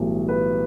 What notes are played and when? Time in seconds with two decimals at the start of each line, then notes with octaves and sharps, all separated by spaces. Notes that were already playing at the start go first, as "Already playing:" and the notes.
Already playing: B1 A2 E3 G3
0.28 B4